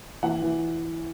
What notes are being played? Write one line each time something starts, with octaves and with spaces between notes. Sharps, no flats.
E3 F#5
E3